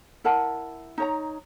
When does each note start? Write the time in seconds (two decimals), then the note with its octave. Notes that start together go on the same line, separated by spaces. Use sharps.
0.24 E4 A#4 F#5 A5
0.98 D#4 C#5 A#5